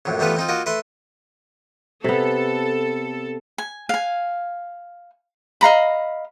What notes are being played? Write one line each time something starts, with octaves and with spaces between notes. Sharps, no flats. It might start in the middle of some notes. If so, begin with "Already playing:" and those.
A#1 F#2 A2
A1 G3 A3 B3 F4 B4
C4 D#4 F4
A#3 F4 F#4 D#5
A3 B4 E5 C6
C3 B3 A4
G#5
F5 G#5
D#5 F5 A#5 B5